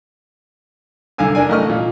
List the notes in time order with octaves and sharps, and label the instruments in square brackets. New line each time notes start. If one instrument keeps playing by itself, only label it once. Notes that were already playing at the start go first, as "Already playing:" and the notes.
[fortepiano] C2 D3 F5 G#5 E6
D4 A#4 D5 G#5
A1 A#4 D#5 C#6 F6
A#2